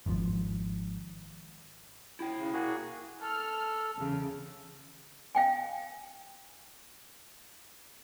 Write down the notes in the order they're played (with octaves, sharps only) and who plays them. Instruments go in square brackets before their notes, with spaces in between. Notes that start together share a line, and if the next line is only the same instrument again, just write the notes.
[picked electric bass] G#1 G#2 C3 F3
[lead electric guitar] E4 G5
[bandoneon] C#3
A#3 F#4 G#4
[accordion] A4 [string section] F6
[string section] E2 C#3
[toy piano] F5 G5 G#5